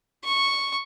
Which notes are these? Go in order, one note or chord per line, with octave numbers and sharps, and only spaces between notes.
C#6